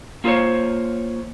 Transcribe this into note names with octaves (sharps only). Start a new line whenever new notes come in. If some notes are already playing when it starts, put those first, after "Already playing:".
A#3 F4 G#4 A4 C5 C#5